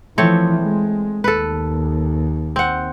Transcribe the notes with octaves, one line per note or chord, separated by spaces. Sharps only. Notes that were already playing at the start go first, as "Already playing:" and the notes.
E3 F3 A3 C4 C#5
G#3
D#2 A4 B4
C4 F#5